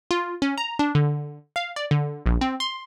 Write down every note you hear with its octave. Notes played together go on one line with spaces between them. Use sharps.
F4
C#4
A#5
D4
D3
F5
D5
D3
A#1
C4
C6